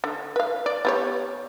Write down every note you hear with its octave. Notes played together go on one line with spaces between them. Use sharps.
D3
B4 F5
D5
B3 G4 C#5